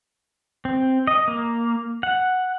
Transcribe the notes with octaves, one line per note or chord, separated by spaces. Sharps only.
C4
D#5
A#3
F#5